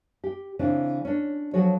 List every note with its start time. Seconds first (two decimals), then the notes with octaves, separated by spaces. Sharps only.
0.24 G4
0.59 C#3 E3 C4 D4
1.05 C#4 D4
1.54 F3 F#3 F#4 A4 C#5